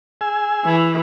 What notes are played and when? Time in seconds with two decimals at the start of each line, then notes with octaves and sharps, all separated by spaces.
0.21 G#4 G#5 E6
0.65 E3